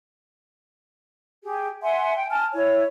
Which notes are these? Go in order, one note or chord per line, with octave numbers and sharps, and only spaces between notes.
G4 G#4
E5 F#5 G#5 C6
G5
G#5 A5 F6
E4 C#5